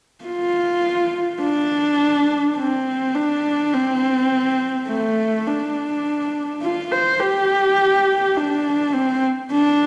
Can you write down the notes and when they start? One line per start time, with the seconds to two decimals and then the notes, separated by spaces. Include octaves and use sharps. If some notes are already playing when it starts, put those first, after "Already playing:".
0.25 F4
1.41 D4
2.57 C4
3.15 D4
3.73 C4
4.89 A3
5.46 D4
6.62 F4
6.92 C5
7.20 G4
8.37 D4
8.94 C4
9.52 D4